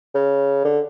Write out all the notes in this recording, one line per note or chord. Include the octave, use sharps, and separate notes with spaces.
C#3
D3